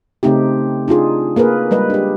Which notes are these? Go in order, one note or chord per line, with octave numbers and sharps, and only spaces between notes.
C#3 A3 C4 D#4 G4
D4 D#4 F4 G#4
A#3 G#4 A#4 B4
G3 G#3 B4 D#5
D4 G4